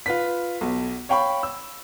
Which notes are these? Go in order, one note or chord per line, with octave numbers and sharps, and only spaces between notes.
F4 B4 B6
B1
C#5 F5 G5 B5 C#6
E6